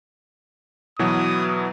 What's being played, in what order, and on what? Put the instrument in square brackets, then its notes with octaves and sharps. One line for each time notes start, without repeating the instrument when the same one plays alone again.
[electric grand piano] B2 E3 F#3 [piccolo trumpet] D#6